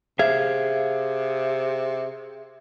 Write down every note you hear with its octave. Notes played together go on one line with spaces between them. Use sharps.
C3 G#4 E5 F5 G#6